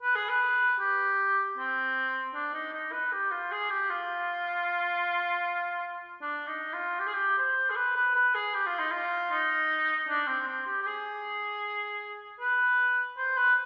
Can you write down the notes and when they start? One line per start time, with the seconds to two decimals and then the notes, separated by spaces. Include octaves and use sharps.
0.03 B4
0.16 G#4
0.29 B4
0.80 G4
1.58 C4
2.35 D4
2.54 D#4
2.73 D#4
2.92 B4
3.12 G4
3.31 F4
3.51 G#4
3.70 G4
3.90 F4
6.22 D4
6.47 D#4
6.74 F4
7.00 G4
7.07 G#4
7.14 G4
7.38 C5
7.70 G#4
7.76 B4
7.96 B4
8.15 B4
8.35 G#4
8.54 G4
8.66 F4
8.79 D#4
8.92 F4
9.31 D#4
10.09 D4
10.27 C4
10.48 C4
10.66 G4
10.81 G4
10.86 G#4
12.40 B4
13.18 C5
13.37 B4